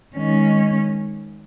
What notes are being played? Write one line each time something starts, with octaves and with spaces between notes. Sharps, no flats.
D#3 G#3 C#4